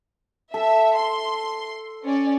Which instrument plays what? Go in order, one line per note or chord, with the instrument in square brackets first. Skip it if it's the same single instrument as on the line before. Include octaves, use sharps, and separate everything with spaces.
[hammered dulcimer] A4 [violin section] E5
[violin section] C6
C#4 D5